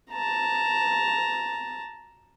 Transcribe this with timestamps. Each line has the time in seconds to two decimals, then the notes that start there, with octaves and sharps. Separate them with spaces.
0.12 A5 A#5